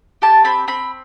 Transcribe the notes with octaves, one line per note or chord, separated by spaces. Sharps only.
G4 A5
C4 B5
C4 B5